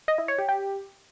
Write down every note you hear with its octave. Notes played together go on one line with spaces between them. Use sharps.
D#5
E4
C#5
G4
G4